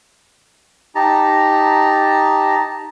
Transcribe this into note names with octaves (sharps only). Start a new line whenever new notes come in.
D#4 G4 A5 A#5